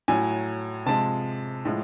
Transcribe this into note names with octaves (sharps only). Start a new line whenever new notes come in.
A2 F#3 G#5
C3 F3 G#3 A5
A2 F3 G#3